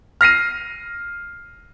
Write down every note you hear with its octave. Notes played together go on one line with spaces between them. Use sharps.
F6 A#6 C7 D#7